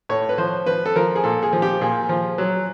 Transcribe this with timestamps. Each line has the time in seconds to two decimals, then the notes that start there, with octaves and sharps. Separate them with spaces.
0.09 A2 C#5
0.29 B4
0.38 F3 C5
0.66 F3 B4
0.86 A4
0.96 F3 A#4
1.16 G#4
1.24 A#2 A4
1.43 G#4
1.53 F3
1.62 G4
1.81 A#2 G#4
2.09 F3
2.38 F#3